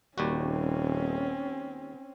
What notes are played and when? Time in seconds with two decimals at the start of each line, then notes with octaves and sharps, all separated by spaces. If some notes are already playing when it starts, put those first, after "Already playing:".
0.18 D#1 D#2 G3 C4 C#4 F#4